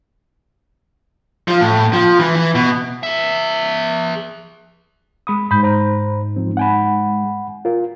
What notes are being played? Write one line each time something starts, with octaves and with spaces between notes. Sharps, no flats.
F3
A2
F3
E3
E3
B2
G#4 E5
G#3 B5 D#6
G#2 B5 G6
C5 A#5 B5
F3 C4
F#5 G#5 B5
F4 A#4